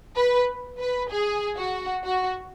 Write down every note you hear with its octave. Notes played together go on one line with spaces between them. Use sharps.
B4
B4
G#4
F#4
F#4